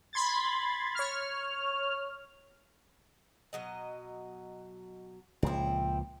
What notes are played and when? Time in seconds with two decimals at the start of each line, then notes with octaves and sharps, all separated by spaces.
0.13 B5 C6 G#6 A6
0.95 C#5 F6
3.53 B2 F#3 D#5
5.43 C#2 A#2 F3 C4 E4